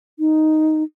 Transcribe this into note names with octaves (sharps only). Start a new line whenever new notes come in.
D#4